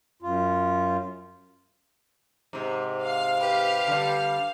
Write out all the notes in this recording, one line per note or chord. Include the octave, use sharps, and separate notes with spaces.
F#2 F4
G#2 C3
F5
G4 B4
D3 G3